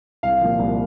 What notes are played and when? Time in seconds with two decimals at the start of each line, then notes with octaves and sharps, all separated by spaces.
0.23 C2 F5
0.41 A#2 F3
0.59 C2